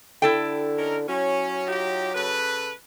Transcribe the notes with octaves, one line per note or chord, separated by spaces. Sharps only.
D3 E4 A4 G5
C#4 D#4 A#4
F#3 C#4
D#4 F4 G4
C#3 A4 B4